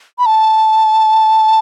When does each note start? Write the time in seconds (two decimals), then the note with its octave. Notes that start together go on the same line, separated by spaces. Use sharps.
0.19 B5
0.26 A5